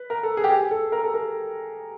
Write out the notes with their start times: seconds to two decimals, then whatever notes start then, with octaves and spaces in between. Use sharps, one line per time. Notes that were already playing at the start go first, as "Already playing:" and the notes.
Already playing: B4
0.10 A#4
0.23 A4
0.37 G#4
0.44 G4
0.51 G#4
0.71 A4
0.92 A#4
1.03 A4
1.14 A#4